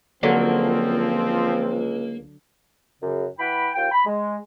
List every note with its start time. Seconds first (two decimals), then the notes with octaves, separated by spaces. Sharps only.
0.23 C#2 D3 F3 F#3 A#3 C4
3.01 F#2 C#3
3.40 E3 F#5 G5 B5
3.75 D#2 F4 G5
3.91 B5
4.06 G#3